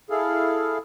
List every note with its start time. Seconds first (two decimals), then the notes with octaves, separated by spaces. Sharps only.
0.10 E4 G#4 A4 F5